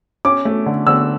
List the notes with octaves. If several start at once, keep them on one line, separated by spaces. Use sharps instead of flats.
C#4 D6
A3
D3
D3 E6